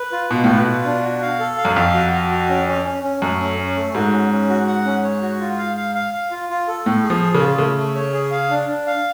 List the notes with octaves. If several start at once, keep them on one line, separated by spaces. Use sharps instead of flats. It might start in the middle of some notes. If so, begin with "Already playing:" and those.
Already playing: B4
F4
B2 F4
A2 B4
B2
F4
D4
F#4
F5
A4
F5
F#2
F2 F5
F#4
F#4
F#4
C#4
C#4
C#4
C#4
F#2 A3
C#4
C#4
A3
G#2 F#4
C#4
C#4
F#4
F#5
C#4
C#5
F#4
F4
F5
F5
F5
F5
F4
F4
A4
A2 A3
G#4
F3
G#4
C#3
F4
C#3 A3
A3
C#5
G#4
F5
D4
D4
F5